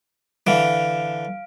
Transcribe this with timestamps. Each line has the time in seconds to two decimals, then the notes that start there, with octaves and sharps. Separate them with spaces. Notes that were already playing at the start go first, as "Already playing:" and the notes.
0.47 D3 E3 F5 D7